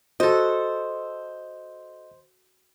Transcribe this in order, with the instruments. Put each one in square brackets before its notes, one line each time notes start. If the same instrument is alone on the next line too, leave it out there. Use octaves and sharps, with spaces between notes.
[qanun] F#4 A4 [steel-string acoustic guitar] C5 [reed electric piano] D#5